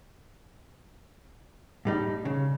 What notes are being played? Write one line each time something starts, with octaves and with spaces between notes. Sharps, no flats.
A2 G3 D#4
C#3